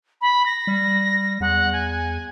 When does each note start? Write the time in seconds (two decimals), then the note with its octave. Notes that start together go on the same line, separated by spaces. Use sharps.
0.21 B5
0.46 A#6
0.67 G3
1.41 E2 F#5
1.73 G#5